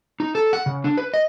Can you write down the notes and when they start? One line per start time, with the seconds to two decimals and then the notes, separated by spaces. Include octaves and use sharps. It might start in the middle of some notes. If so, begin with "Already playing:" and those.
0.20 D#4
0.35 A4
0.53 F#5
0.66 C#3
0.84 D4
0.97 B4
1.14 D#5